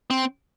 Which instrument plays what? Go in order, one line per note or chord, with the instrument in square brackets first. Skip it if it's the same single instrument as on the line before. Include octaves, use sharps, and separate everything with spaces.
[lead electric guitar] C4